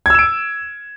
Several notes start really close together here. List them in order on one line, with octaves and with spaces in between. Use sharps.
G#6 E6 E7 D7